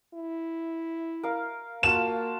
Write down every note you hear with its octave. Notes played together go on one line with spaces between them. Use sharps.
E4
A#4 F5
A#3 F4 F#4 A5 E7